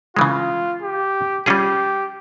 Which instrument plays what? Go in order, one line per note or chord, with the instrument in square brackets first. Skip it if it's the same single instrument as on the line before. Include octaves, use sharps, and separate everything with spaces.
[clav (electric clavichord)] C#3 E3 G#3 [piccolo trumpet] F4
[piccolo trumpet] G4
[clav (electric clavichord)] G3 C#4 F4 G#4 [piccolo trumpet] G4